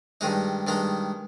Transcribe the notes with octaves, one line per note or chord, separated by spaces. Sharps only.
G2 D#3 G#3 D#4
G2 D#3 G#3 D#4